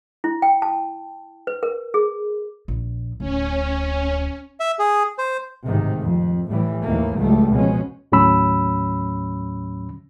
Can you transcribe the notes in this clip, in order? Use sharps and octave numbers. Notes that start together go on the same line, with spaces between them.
E4
G5
A5
B4
A#4
G#4
A#1
D1 C#4
E5
G#4
C5
A1 G#2 C3 D#3
F2
A2 E3 G3
D#2 G#2 E3 A3 A#3
C#2 F#3 G3 A3
B2 F3 G#3 C#4
D#2 A2 F#3 C#4 B5 E6